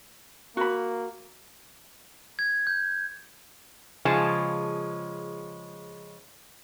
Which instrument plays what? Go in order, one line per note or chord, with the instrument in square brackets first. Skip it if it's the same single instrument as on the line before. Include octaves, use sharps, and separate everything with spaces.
[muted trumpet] A#3 [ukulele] F#4 B5
[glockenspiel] G#6
G6
[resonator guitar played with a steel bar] C#3 F3 G#3 A5